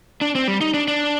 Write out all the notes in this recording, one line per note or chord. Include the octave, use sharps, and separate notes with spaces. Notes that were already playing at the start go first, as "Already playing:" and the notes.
D4
C4
G3
D#4
D4
D4